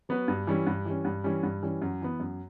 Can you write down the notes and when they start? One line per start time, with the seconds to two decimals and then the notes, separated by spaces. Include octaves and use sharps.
0.09 F#3 B3 F#4 B4
0.28 G2
0.47 E3 G3 C#4
0.67 G2
0.85 E3 G3 C#4
1.05 G2
1.24 E3 G3 C#4
1.43 G2
1.63 E3 G3 C#4
1.82 F#2
2.02 E3 B3
2.20 F#2